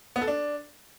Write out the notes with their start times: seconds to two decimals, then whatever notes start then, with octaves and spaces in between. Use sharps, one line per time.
0.16 B3
0.22 A4
0.27 D4